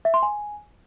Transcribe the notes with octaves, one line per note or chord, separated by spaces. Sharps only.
E5
C6
G#5